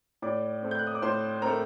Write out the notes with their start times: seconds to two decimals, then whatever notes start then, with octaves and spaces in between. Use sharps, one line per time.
0.22 A2 D5 D6
0.62 A3 C4
0.71 G6
0.79 F#6
0.87 D#6
0.95 D6
1.02 A2 C5 C6
1.42 A3 C4 A#4 A#5